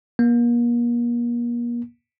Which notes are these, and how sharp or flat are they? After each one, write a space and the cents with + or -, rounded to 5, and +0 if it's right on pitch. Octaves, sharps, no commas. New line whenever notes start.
A#3 +35